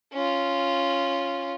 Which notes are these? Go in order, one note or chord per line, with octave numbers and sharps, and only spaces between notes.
C#4 F4